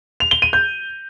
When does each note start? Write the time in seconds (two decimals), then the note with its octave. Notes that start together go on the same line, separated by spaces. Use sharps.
0.20 F7
0.31 G7
0.42 D#7
0.53 G6